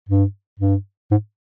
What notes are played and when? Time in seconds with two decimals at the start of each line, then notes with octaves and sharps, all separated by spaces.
0.09 G2
0.60 G2
1.11 G#2